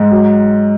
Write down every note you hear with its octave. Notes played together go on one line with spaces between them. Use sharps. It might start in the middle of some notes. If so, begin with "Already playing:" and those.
Already playing: G#2
F#3